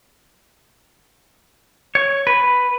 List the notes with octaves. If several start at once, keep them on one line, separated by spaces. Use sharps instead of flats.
C#5
B4